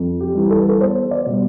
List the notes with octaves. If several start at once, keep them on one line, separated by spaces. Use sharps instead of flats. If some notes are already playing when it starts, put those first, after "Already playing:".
Already playing: F2
G4
E3 G3
A4
B4
A4
E2 C5
D5
B2 G3